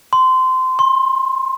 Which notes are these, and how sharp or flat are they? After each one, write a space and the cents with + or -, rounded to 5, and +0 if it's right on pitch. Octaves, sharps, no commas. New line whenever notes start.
C6 -20
C6 +30